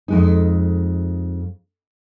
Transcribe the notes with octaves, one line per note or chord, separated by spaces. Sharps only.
F2 G#3 D#4